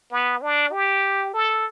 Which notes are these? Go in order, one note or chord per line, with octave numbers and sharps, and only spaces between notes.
B3
D4
G4
A4